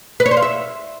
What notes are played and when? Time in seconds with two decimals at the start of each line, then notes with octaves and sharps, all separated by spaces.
0.20 B4
0.26 C#5
0.31 C5
0.37 F5
0.42 E5